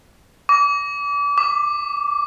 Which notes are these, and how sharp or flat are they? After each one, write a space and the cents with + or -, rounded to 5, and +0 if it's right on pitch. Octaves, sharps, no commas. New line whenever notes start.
D6 -35
D6 +10